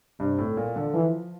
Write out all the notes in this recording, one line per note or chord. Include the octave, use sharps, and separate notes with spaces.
G2 C3
A2
A#2
D3
E3 F3